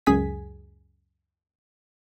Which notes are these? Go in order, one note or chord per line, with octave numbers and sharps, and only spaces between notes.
C#2 F#2 G#4 G#5 B6